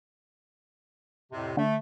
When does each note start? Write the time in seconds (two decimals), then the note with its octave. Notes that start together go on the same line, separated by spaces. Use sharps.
1.31 F2 A2 C3
1.57 D3 A3